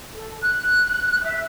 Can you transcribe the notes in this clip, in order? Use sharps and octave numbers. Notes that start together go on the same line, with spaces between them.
A4
F#6
E5